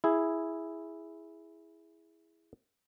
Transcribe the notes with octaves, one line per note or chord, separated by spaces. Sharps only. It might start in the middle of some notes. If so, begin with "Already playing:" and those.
E4 G#4